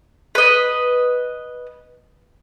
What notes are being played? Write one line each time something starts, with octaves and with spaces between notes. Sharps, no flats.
B4 D#5